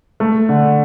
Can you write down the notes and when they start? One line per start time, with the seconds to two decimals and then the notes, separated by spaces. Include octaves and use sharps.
0.20 A3
0.49 D3